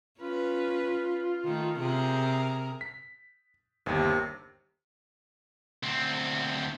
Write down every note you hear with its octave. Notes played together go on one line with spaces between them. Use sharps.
C#4 F4 B4
D#3 A3
C3 G#4 A#4
B6
G1 D#2 C3
D2 C4